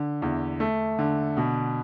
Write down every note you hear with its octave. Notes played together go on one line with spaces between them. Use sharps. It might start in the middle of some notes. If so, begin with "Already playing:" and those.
Already playing: D3
E2
A3
D3
B2